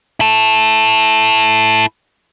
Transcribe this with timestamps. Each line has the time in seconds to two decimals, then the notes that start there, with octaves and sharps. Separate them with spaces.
0.20 E4 A4